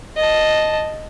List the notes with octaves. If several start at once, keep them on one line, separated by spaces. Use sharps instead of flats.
D#5 A5